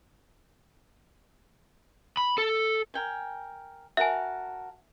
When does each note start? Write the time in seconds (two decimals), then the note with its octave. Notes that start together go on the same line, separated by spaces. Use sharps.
2.17 B5
2.38 A4
2.94 A#4 G5 G#5
3.97 F#4 A#4 E5 G#5 A5